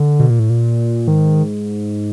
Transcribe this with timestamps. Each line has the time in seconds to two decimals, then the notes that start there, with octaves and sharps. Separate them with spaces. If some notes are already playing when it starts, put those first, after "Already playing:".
Already playing: D3
0.20 B2
0.30 A#2
0.39 A2
0.50 A#2
1.07 G#2 D#3